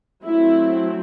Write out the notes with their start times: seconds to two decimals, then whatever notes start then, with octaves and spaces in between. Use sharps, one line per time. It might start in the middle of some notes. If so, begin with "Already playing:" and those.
0.24 F#3 A3 C4 E4